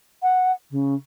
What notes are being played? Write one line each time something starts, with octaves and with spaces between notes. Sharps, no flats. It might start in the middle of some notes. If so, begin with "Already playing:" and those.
F#5
C#3